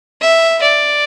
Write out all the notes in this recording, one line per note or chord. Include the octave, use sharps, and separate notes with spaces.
E5
D5